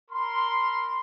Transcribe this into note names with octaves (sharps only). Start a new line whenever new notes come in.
A#4 B5 C6